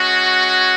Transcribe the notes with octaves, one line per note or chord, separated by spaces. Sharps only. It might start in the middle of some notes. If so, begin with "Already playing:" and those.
Already playing: G#3 C#4 F#4